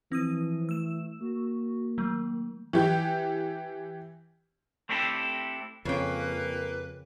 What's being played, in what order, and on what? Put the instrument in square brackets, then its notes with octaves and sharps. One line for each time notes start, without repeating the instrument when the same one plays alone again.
[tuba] E3 [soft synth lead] F3 [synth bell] C4 D#6 D#7
[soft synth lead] A3 [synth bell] E6 E7
[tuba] A#3 [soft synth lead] F#4
[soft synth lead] D#3 [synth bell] F#3 A3
[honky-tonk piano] E3 G4 G6
[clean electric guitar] A3 C4 D4 E4 G4 A4
[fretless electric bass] F2 [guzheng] C#3 G5 [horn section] A#3 [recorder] B4